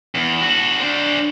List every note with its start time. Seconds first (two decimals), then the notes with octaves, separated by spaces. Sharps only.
0.15 E2
0.41 F#4 A4
0.80 D4 C5